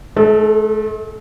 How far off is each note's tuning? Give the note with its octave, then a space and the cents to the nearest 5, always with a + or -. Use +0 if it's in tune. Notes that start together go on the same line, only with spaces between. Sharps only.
A3 -45 A4 +10